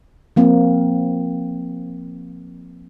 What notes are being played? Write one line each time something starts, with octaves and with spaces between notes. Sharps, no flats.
F3 A#3 C4